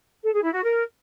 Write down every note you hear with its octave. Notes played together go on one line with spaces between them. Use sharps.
A4
G#4
E4
F#4
A#4